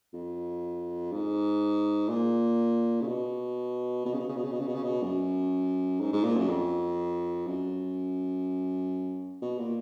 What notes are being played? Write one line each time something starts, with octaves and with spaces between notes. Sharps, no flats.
F2
G#2
A#2
C#3
B2
B2
C#3
B2
C#3
B2
C#3
B2
C#3
B2
C#3
B2
F#2
G#2
G#2
A#2
F#2
F2
F#2
B2
A#2